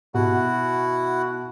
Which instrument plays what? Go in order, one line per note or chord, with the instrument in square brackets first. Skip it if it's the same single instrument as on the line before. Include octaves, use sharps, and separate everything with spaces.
[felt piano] B2 [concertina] E4 F#4 F#5